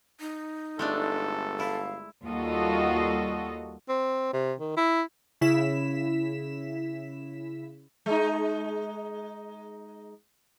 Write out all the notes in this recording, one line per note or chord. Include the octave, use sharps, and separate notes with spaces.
D#4
G1 G#3 A3 D4 A4
E4 F5
D#2 G3 F4 F#4 A4 D#5
C4
C3
D#3
E4
C#3 E4 B6 E7
G#3 D#4